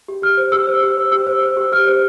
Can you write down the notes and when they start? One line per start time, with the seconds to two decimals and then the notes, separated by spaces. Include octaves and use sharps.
0.08 G4
0.22 G4 F6
0.37 C5
0.52 G4 E6
0.67 C5
0.83 G4
0.97 C5
1.12 G4 E6
1.27 C5
1.43 C5
1.57 G4
1.72 G4 F6
1.87 C5